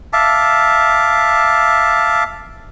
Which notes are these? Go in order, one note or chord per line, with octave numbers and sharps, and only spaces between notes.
E5 F5 A5 D6